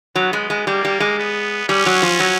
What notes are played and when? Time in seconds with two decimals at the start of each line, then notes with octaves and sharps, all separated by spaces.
0.16 F#3 B3
0.33 G#3
0.50 G#3
0.67 G3 A#3
0.85 G3
1.00 G#3
1.18 B3
1.69 G3 C#4
1.86 F#3
2.02 F3
2.20 F#3